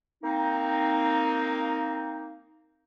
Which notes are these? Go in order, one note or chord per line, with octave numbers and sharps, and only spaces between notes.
A#3 C4 D#4